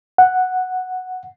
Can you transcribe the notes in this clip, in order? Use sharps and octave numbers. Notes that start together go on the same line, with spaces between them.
F#5